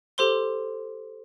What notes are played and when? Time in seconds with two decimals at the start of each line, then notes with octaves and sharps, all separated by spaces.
0.18 G4 A4 C5 C6 G7